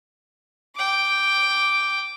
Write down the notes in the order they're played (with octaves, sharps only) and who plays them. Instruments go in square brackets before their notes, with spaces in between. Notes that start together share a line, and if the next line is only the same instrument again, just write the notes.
[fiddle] G5 D6